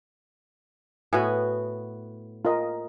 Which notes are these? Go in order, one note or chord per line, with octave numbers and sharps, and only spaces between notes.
A2 B3 F#4 G#5
F4 A#4 D#5